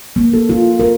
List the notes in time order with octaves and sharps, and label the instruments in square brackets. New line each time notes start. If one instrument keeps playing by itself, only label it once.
[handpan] A#3
A4
F4
A#4